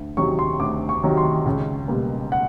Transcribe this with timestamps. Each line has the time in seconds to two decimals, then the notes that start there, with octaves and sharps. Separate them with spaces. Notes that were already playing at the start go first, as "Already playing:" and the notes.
Already playing: D2
0.17 C3 D#3 F#3 C#6
0.39 C6
0.60 D2 D6
0.89 C#6
1.03 C3 D#3 F#3
1.17 C6
1.46 C#2
1.88 B2 G3 A#3
2.32 F#5